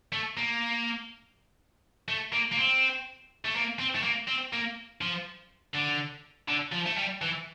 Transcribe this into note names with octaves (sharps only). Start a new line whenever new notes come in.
A3
A#3
A3
A#3
A#3
C4
A3
A#3
C4
A3
A#3
C4
A#3
F3
D3
D3
F3
A3
G3
E3